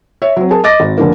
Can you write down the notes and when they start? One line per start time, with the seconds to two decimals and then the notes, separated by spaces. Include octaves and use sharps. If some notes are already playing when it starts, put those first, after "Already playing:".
0.22 C#5 E5
0.37 F#3 C4
0.51 G#4 A#4 A5
0.64 D#5 D6 A6 A#6
0.80 G#1
0.98 F1 D3 A#3